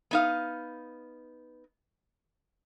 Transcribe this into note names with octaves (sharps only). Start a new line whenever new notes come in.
B3 D#4 F5